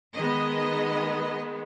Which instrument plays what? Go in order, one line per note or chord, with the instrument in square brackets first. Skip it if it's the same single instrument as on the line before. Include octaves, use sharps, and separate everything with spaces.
[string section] D#3 G#3 B3 D#5